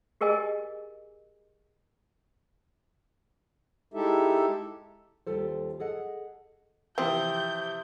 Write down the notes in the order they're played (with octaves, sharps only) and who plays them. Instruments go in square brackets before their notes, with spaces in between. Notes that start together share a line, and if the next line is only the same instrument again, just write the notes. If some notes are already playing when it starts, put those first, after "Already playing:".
[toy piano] G4 G#4 A#4 D#5 G#5
[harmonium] G#3 D#4 E4 G4 A4 E5
[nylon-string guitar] D#2 G3 F4 A4 C5
G#4 A4 D#5 F#5
[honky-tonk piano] C3 E3 F3 [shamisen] C4 [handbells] E5 C6 D#6 [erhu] G6